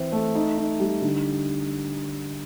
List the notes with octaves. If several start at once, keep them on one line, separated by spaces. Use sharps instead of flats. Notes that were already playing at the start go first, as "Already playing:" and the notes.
Already playing: E3 C4
A3
D#4
D#4
G3
D3